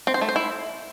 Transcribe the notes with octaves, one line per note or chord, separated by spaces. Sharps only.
C4
C5
A3
C5
E4